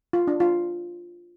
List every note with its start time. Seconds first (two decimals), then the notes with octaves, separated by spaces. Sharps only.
0.13 F4
0.27 D4
0.40 F4